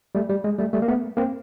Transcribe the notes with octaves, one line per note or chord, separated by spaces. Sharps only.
G3 A3
G3
G#3
G3 A3
G3 A3
A#3
A3 B3
A#3 C4